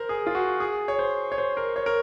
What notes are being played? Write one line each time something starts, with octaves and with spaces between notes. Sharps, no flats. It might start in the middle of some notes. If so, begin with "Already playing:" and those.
Already playing: A#4 C5
G#4
F4
F#4
G#4
C#5
C5
C#5
C5
A#4
C#5
A#4